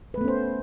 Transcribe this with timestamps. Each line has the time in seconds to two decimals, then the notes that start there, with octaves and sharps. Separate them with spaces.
0.14 B4
0.18 A3
0.21 B3
0.24 C#4
0.28 C5